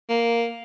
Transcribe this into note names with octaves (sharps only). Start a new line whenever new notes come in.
A#3